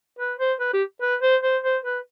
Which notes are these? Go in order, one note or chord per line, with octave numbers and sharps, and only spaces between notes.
B4
C5
B4
G4
B4
C5
C5
C5
B4